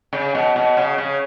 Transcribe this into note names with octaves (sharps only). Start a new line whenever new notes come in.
C#3
B2
B2
C#3
C#3